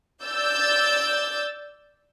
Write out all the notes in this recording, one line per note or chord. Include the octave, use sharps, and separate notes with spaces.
D5 E6 G6 A6